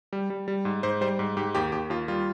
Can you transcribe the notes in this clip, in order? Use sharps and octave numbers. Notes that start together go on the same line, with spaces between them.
G3
G3
G3
G#2
G#2 C5
G3 C5
G#2
G#2 G4
D#2 G4
D#2 G4
D#2 F4
G3 F4